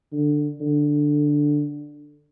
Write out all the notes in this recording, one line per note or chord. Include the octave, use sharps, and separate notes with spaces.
D3
D3